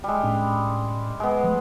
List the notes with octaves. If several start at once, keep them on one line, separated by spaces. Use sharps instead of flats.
G3 G#3
A2 C#4 D4
G#3 B3
F3 A3